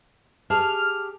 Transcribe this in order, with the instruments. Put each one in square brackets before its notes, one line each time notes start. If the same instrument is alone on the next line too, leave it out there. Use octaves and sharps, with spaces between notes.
[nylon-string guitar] G4 G#4 A5 [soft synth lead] F6